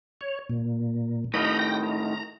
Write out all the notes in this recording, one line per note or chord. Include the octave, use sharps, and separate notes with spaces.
C#5
A#2
A2 D#3 D#5 A#5 B5
G5 A#6
A#5